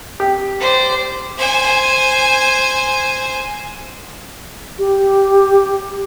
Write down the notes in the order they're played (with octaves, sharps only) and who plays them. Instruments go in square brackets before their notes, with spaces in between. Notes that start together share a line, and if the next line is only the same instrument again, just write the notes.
[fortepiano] G4
[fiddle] C5 D5
C5 G#5
[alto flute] G4